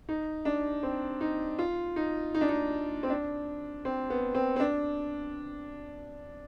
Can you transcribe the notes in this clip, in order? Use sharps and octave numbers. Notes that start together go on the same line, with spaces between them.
D#4
D4
C4
D#4
F4
D#4
D#4
D4
D#4
C4
D4
C4
B3
C4
C4
D4